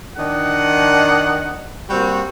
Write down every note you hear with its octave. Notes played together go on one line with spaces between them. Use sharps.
D#3 D4 D#5 F#5
G3 A#3 C4 F#4